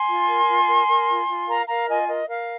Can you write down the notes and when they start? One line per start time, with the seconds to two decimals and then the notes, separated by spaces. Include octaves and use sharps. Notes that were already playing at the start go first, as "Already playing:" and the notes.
Already playing: G#5 C6
0.09 F4
0.29 A#4
0.48 F4
0.69 A#4
0.88 A#4
1.08 F4
1.29 F4
1.48 A#4 F5 A#5
1.68 A#4 F5 A#5
1.88 F4 D#5 G#5
2.08 A#4 D#5
2.27 A#4 F5